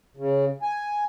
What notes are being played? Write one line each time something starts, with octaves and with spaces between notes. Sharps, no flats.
C#3
G#5